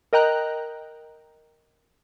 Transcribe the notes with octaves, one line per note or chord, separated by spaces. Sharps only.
A#4 D#5 G5 A#5 F#6